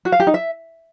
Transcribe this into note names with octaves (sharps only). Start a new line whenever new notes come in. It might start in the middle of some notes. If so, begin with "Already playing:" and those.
F#4
F5
G4
D#4
E5